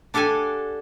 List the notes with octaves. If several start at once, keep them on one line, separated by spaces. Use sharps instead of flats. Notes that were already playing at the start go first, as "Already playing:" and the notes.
D4 G4 A4 F#5 G#5